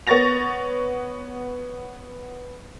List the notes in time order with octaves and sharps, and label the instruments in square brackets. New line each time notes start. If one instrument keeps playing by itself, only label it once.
[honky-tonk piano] B3 C#5 C#6 A6 A#6 F7